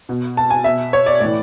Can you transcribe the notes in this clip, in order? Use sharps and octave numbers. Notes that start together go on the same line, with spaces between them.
B2
A5
G#5
B2 E5
C#5
D5
A2 D5
E3